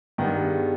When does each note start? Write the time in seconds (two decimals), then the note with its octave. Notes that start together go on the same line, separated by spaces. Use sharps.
0.18 G2 D#3 B3 G4
0.34 G#4
0.50 G4